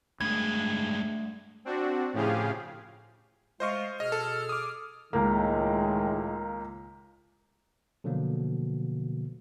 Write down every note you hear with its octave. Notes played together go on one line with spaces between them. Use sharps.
G2 G#3 A3 B3 D4 G#6
C4 D4 F#4
A2 C#3 F3 G4 G#4 F5
G#3 A3 F4 C5 D#5 C#6
B2 G#4 D#5 F6
A4
D6 D#6
C#2 A2 D#3 G#3 A#3
B2 D3 F3 F#3 A#3